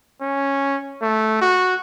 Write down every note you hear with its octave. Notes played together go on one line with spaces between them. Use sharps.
C#4
A3
F#4